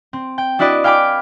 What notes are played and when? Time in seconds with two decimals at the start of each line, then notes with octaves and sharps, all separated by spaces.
0.13 C4
0.38 G5
0.59 D4 E4 F#4 B4 D5 D#5
0.84 F5 G5 G#5 B5 D6